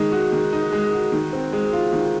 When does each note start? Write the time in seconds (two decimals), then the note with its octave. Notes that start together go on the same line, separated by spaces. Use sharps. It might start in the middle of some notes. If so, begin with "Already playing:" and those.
Already playing: D#3 G#3 D#4
0.12 F#4
0.32 D#3
0.53 D#4
0.72 G#3
0.93 F#4
1.12 D#3
1.33 C4
1.53 G#3
1.73 F4
1.93 D#3